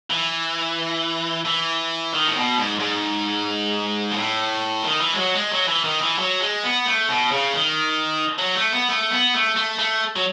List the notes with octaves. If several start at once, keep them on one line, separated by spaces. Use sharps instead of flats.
E3
E3
D#3
A2
B2
G#2
G#2
B2
A2
D#3
E3
G#3
F#3
G#3
F#3
E3
D#3
E3
F#3
G#3
B3
A3
B2
C#3
D#3
F#3
A3
B3
A3
B3
A3
A3
A3
F#3